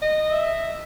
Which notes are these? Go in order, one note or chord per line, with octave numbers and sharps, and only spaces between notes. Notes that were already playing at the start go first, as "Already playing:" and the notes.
D#5
E5